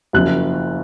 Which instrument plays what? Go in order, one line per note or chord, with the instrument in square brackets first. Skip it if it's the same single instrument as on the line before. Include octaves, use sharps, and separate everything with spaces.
[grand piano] F#1 F#2 F3 F#6